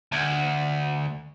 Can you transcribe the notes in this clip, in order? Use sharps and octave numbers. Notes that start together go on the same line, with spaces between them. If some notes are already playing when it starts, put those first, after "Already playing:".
D2